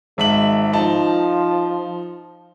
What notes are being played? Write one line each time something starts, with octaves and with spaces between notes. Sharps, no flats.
G#1 G#3 E5 F#7
F3 D#4 A5